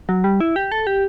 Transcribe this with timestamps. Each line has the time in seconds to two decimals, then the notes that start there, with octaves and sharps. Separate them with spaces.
0.09 F#3
0.24 G3
0.41 E4
0.56 G4
0.72 A4
0.87 G4